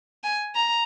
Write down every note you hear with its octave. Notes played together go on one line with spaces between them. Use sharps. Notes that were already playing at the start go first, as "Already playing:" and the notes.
G#5
A#5